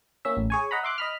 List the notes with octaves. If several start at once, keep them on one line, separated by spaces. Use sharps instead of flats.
A#3 C#4 E5
A1
G#4 C#5 G#5
D#5 F#5 A#5 B5
E5 C6 D6 F#6
D#5 B5 F6